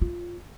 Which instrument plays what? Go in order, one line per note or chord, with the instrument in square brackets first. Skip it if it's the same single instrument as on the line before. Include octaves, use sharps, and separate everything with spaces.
[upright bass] F4